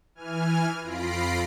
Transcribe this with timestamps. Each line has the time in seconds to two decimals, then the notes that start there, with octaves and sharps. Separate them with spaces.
0.15 E3 G#5 F6
0.82 F2 F4 B5 A#6 C7 D7